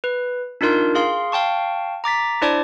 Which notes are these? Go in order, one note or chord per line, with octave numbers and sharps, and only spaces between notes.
B4
D4 D#4 F4 A#4 C6
G#4 F5 C6
F5 G5 A5 C#6
A#5 D6 A6 B6
D4 E4 C5 D5 A5 D6